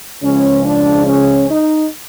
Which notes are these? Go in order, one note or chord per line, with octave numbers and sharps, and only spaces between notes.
C#2 C#3 F3 C#4
D4
C#4
D#4